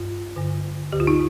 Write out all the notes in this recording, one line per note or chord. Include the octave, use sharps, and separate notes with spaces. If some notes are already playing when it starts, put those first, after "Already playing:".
Already playing: G2 F4
G2 D3
D2 D3 G4
F4
D#4